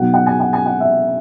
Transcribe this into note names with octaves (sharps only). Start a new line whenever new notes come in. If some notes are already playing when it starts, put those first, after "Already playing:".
Already playing: B2 F#3 B3 D#4 F#5
F#5
G#5
F#5
G#5
F#5
E5